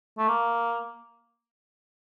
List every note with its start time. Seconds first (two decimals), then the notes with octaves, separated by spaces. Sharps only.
0.18 A3
0.28 A#3